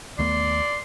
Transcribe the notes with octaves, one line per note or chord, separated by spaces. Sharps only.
D#2 A3 B3 D5 C6